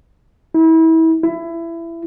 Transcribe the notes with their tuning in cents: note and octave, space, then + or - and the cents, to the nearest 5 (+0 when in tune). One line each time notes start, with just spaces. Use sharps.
E4 -30
E4 +20